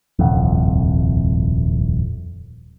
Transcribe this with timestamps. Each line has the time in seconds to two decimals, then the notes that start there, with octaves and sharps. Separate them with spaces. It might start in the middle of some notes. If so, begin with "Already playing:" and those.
0.19 D#1 C2 F2